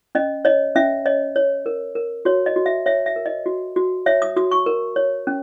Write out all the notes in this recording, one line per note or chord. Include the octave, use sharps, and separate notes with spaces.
C#4 D#5
C#5 D#5
C#4 E5
C#5 D#5
C#5
A#4
A#4
F#4 C#5
D#5
F#4
E5
C#5 E5
E5
A#4
D#5
F#4
F#4
C#5 E5
D#6
F#4 D#6
C#6
A#4
C#5
C#4